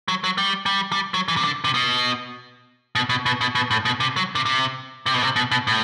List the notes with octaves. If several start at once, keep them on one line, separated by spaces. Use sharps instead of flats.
F#3
F#3
G3
G3
G3
F#3
E3
C3
D3
C3
B2
B2
B2
B2
B2
B2
A2
B2
C3
F#3
C3
C3
C3
B2
C3
B2
B2
A2